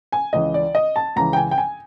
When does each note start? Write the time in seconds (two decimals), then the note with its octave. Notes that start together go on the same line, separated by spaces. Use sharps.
0.12 G#5
0.33 C#2 C#3 E3 D#5
0.54 D5
0.75 D#5
0.96 A5
1.16 C#2 C#3 E3 A#5
1.33 G5
1.37 G#5
1.51 G5
1.58 G#5